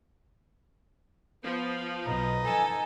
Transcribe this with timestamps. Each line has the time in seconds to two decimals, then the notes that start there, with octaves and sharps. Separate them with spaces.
1.44 F3 B3
2.06 B1 D#4 B4 D#5
2.45 A4 G#5